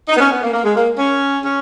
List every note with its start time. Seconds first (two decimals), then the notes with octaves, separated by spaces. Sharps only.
0.08 D#4
0.15 B3
0.19 C#4
0.31 B3
0.42 A#3
0.53 A#3
0.64 G#3
0.76 A#3
0.98 C#4
1.43 C#4